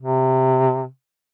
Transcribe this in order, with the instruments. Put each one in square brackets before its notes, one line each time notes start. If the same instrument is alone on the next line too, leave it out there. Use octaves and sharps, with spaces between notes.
[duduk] C3